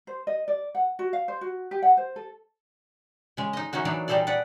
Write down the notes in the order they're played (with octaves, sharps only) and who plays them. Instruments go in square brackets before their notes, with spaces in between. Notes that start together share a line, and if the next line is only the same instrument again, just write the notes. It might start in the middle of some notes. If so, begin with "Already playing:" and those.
[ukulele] C5
D#5
D5
F#5
F#4
F5
C5
F#4
G4
F#5
C5
A4
[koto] C#3 G#3
D#4 D#5
E3 A#3 C#4 D#4 F#4
E3 F#3 D4 D#4 D5
A#2 G3 D#4 G#4 A4 D5
B4 D5 F#5